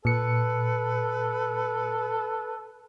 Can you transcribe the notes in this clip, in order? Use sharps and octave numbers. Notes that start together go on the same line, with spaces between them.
A#2 A4 B4 C#7